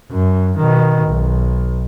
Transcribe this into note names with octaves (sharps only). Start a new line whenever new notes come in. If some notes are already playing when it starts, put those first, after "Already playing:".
F#2
B2 D#3
B1